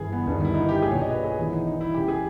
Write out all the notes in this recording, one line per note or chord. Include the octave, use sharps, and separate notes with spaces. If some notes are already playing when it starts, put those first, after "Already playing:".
Already playing: G1 G2 E3 G#4
B3
G1 G2 D#3
E4
D#4
G4
B1 A#2 G#4
C#5
D#5
B4
G#4
E1 E2 D#3 E4
D#4
D#4
E4
C#2 C#3 E3 G4
G#4